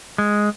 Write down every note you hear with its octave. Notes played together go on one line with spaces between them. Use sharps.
G#3